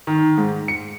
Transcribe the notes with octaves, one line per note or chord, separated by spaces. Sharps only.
D#3
G#2
C#7